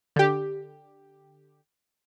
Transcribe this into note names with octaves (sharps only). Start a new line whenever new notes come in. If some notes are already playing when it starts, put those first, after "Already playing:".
D3 G4